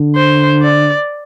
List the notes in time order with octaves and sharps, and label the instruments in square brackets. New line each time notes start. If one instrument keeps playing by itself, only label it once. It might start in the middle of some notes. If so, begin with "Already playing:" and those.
Already playing: [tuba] D3
[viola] C5
D5